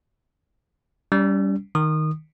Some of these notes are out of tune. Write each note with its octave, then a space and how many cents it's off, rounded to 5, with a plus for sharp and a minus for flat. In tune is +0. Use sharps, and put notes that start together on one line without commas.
G3 +0 C#4 +40
D#3 +0 D#6 -25